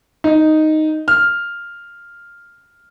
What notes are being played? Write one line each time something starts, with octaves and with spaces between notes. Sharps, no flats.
D#4
F6